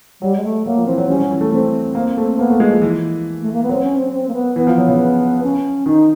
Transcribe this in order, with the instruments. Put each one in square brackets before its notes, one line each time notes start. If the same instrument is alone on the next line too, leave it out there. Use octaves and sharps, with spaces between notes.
[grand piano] F#3 [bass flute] G3
[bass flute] G#3
A3
[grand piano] F#3 [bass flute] A#3
[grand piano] F3
[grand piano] E3 [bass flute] C4
[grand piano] F#3
[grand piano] G3 [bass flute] C#4
[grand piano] F#3
E3
A3
[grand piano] A3 [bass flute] C4
[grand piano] A#3
A3
[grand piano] A#3 [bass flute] B3
[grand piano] A3
G#3
F3
E3
[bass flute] A3
A#3
B3
[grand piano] F#3 [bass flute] C4
[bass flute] C#4
C4
C4
A#3
B3
[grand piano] E3 [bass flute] B3
[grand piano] F3
F#3
C#3
[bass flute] C#4
[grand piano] D#3 [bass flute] D#4